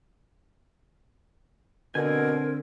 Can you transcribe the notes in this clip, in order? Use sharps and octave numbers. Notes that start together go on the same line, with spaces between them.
B2 D3 C4 A#4 G#5